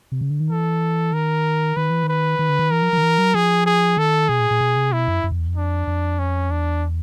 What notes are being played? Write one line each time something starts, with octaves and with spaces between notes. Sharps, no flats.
C3
C#3
D3
D#3
E3 A4
D#3 A#4
D#3 B4
E3
D#3 B4
D#3
D3
D#3
E3 A#4
F3
F3
D#3
E3
F#3
F3 G#4
G#4
D#3 A4
B2 G#4
A#2
A#2
B2
C3
B2 E4
F#2
F#2
F2
E2
F2
D4
F2
C#4
E2 D4